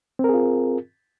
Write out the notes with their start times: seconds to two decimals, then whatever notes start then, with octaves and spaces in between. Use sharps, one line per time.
0.19 C4
0.24 A#4
0.29 G#4
0.34 F4